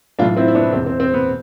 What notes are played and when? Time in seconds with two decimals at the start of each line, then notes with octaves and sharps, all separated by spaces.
0.19 B1 A2 E3 D4 F4
0.37 C4 E4
0.48 E4
0.55 B3 D4
0.73 E1 E2 B2 C4
0.86 C4
1.00 C4
1.14 B3